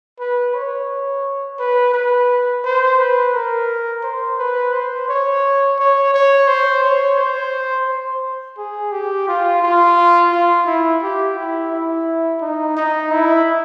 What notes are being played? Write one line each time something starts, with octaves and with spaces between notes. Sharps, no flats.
B4
C#5
B4
B4
C5
B4
A#4
C5
B4
C5
C#5
C#5
C#5
C5
C#5
C5
C5
G#4
G4
F4
F4
F4
E4
G4
E4
E4
D#4
D#4
E4